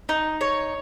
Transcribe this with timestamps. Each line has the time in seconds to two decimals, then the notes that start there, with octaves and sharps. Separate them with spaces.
0.09 D#4
0.41 C#5